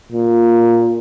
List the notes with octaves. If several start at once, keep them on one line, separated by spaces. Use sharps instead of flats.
A#2